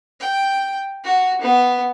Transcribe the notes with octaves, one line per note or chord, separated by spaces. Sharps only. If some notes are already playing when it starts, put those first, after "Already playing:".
G5
F#4
B3